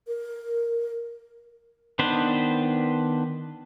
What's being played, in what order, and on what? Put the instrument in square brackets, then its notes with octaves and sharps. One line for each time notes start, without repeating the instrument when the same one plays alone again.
[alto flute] A#4
[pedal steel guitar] D#3 B3 D4 B4 C5